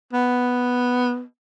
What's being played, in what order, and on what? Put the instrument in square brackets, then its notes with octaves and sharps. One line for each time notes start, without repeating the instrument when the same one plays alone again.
[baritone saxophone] B3